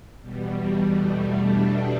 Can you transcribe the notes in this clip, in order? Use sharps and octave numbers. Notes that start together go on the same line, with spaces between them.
E2 B2 G3
A3
D4